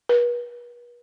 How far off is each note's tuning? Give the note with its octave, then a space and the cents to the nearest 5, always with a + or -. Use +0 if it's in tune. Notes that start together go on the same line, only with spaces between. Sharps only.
B4 -40